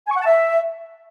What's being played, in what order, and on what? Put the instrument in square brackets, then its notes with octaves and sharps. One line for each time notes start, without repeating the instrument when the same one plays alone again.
[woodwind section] G#5
C#6
F#5
A5
E5